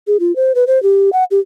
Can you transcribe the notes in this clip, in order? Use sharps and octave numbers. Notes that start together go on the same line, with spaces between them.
G#4
F4
C5
B4
C5
G4
F#5
G4